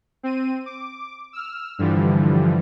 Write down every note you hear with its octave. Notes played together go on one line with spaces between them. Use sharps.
C4 D#7
D6
E6 F6
G2 D3 E3 F3 G3